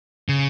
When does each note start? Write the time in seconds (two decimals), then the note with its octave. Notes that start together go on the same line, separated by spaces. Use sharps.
0.29 C#3